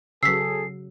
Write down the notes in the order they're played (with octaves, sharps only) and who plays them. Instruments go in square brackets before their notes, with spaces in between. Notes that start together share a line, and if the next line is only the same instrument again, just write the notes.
[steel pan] C#3 F#3 [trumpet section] G#4 A4 [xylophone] E6 B6 [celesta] C7